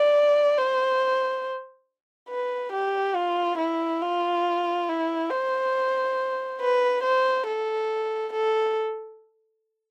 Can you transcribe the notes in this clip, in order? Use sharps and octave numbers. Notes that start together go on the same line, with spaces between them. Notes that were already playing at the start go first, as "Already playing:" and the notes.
Already playing: D5
C5
B4
G4
F4
E4
F4
E4
C5
B4
C5
A4
A4